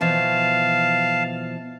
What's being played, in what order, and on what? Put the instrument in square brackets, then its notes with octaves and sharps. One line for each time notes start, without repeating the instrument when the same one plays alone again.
[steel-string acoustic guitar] B2 E3 F3 [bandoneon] F5 A5